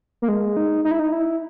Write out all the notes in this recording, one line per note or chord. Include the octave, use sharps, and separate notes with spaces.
A#3
G#3
D#4
D#4
E4
D#4
E4